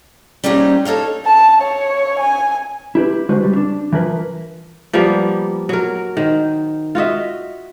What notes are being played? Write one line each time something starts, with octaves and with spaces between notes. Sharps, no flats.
G3 A#3 C#4 D#4 C5
D#4 A4 C#5 F5
A5
C#5
G#5
E4 G4 B4
D3 G#3 F#4 B4 C5
C#2 G3
D4
E3 F3 A#4 B4
F3 G3 A#3 B3
F#3 A#4
D#3 C5
F4 F#4 D#5 E5